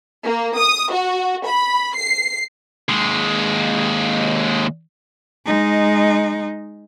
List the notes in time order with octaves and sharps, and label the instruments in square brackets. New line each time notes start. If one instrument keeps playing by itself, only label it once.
[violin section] A#3
D#6
F#4
B5
C7
[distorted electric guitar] D#2 G#3
[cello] G#3 D#4